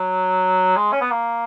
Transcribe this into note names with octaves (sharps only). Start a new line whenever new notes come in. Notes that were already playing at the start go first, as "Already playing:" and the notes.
Already playing: F#3
G#3
C#4
B3
A#3